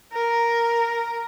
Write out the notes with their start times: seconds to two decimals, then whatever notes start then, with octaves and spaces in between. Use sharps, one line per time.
0.13 A#4